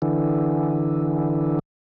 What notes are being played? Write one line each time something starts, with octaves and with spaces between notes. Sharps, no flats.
D3 E3